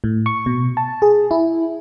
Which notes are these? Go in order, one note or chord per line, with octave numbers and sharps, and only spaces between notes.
A2
C#6
B2
A5
G#4
E4